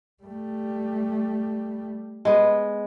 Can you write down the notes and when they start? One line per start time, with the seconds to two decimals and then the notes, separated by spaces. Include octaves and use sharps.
0.23 G3 A3
2.25 G#3 B3